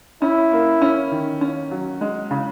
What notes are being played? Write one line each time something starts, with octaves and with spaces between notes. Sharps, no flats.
C#4 E4
A#3
C#4
D#3
C#4
F#3
G#3
C#3